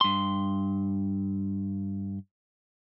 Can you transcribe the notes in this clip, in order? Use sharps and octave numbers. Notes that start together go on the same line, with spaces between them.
G2 C6